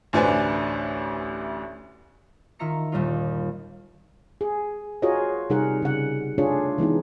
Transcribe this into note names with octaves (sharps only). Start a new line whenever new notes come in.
A1 D2 D4 B4 C5 G#5
D#3 F4 E5 A#5 C#7
G1 D#2 A#2 G3 D#4 F4
G#4
F4 F#4 G#4 A#4 C#5 D#5
C3 G3 D#4 G#4 A#4 F#5
C#3 F#5
A3 D4 F4 G#4 C#5
E3 G#3 B3 D#4